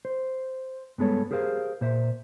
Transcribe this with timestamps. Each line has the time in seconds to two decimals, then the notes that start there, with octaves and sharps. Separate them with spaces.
0.05 C5
0.98 G2 G#3 B3 A4 C#5
1.31 G4 G#4 A#4 C5 F5
1.81 A#2 C5 E5